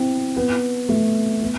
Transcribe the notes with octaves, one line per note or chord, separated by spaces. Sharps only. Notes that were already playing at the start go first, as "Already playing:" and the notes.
Already playing: C4 E4
B3
A3
B3